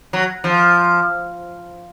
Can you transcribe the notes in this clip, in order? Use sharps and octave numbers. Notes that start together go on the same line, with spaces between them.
F#3
F3